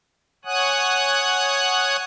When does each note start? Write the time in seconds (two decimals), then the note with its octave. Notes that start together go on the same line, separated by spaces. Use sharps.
0.45 C#5 F#5 G#5 D#6 F#6